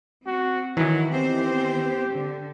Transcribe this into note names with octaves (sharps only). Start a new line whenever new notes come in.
C4 F#4
D#3 E3 F#3 E4
B3 C4 G4 C5
D3